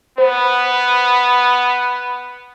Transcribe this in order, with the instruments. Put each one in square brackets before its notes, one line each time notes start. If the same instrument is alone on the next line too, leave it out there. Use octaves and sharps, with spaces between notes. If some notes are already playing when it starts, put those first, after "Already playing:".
[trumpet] B3 [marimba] C5